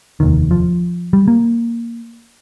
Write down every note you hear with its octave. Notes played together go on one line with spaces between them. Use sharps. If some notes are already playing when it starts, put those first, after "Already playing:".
F1 D#2 D#3
F3
G3
A#3